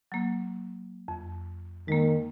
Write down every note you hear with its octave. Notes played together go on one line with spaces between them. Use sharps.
F#3 A#3
F2
D#3 G#3 A#3